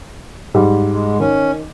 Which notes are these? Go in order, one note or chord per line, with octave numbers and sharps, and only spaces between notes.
G#2 G3
G#3
D#3 C#4